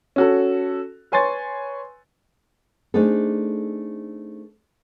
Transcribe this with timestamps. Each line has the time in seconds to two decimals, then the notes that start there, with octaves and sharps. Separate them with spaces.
0.16 C#4 F#4 A4
1.12 B4 C#5 G#5 C6 C#6 A6
2.94 A3 C4 D4 D#4 G#4 A4